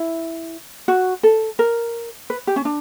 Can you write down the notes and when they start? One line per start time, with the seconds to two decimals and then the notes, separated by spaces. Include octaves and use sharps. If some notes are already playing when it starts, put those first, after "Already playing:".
Already playing: E4
0.88 F#4
1.23 A4
1.59 A#4
2.30 B4
2.47 G4
2.56 C#4
2.65 D4